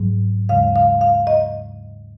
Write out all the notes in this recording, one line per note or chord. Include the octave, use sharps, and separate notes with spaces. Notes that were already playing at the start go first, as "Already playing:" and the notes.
Already playing: G#2 F#3
D#2 C#3 G#3 F5
F5
F5
D#5